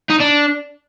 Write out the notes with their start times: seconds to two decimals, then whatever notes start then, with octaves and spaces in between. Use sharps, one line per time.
0.10 D#4
0.20 D4